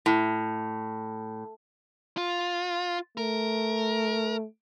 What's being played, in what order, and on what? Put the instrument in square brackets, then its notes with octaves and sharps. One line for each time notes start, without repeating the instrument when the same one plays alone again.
[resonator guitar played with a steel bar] A2
[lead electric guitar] F4
[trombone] A3 [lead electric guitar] A#4